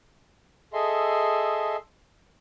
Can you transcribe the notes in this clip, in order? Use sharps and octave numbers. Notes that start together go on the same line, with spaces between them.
G#4 A4 D#5 E5 C6